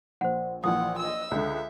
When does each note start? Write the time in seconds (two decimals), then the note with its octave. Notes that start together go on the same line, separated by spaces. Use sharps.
0.21 A#1 C5 F#5
0.64 A#1 E3 F3 F#5 D#6
0.99 D#5 E6
1.31 C#2 D3 E5